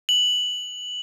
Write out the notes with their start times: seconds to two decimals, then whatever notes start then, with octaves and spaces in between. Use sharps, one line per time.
0.09 F#7